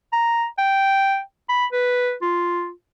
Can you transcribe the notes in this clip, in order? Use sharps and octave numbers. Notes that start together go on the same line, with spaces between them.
A#5
G5
B5
B4
F4